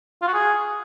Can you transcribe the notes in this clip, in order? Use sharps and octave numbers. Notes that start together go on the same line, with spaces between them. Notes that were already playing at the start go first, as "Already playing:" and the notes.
F4
F#4
G#4